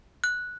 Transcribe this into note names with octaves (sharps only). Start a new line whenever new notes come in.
F#6